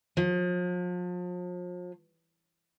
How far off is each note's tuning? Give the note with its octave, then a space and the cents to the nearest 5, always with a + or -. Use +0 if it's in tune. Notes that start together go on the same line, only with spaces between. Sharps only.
F3 +40